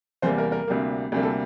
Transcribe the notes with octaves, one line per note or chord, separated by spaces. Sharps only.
E2 C3 G3 A#3 C5
A#4
A#4
D2 C3 G3 A#3
D2 C3 G3 A#3
A4